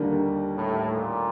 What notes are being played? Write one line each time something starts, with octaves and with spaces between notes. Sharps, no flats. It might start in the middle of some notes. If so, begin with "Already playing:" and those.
Already playing: D#2 D3 G3 A#3 D4
A2
A#2